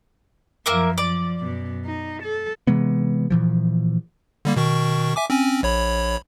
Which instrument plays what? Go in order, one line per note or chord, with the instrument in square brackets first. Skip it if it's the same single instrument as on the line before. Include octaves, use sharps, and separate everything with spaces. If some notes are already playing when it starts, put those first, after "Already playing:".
[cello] F#2 F3 [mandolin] A#3 A#4 E5
[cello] F3 [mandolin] D5 D6
[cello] F#2 B2
D#4
A4
[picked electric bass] C3 E3 G#3 B3
A#2 E3 F3
[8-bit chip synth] D3 G3 A#3
B2 D#3 C#6
E5 G#5 D6
C4 C#4 G#5
A#1 C#5 B5